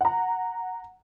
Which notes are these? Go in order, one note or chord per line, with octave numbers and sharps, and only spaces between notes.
F#5 A#5